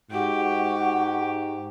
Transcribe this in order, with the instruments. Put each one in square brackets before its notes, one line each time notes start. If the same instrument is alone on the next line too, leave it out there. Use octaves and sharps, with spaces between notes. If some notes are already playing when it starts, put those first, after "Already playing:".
[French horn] G#2 [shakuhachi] F#4 [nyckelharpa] G4